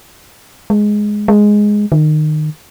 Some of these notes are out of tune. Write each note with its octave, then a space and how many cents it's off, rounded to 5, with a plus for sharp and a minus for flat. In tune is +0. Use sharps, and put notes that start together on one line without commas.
G#3 +5
G#3 +0
D#3 -25